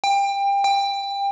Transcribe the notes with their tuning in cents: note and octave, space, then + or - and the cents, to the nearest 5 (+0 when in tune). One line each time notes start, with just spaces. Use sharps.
G5 +25
G5 +25